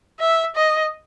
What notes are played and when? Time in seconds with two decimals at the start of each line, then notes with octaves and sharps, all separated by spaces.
0.20 E5
0.55 D#5